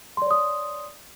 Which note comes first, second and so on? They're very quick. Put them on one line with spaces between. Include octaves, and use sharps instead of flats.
C6 D5 C#5 D#6